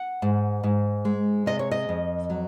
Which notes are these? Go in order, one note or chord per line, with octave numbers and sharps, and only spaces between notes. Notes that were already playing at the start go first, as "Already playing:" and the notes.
Already playing: F#5
G#2
G#2
G#3
C3 D#5
C#5
D#5
F2
F#3